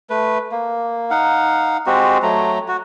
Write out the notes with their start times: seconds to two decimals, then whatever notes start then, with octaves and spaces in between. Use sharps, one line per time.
0.10 A3 B4
0.52 A#3
1.10 D#4 F5 F#5
1.87 G#3 C4 F#4 G4
2.23 F#3 A3 A#5
2.68 F#4